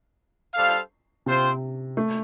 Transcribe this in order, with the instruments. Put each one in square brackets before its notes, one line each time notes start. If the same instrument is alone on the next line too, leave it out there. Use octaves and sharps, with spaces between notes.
[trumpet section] G3 D4 A4 C5 F5
[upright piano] C3 [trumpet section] C4 F4 C5
[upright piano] A3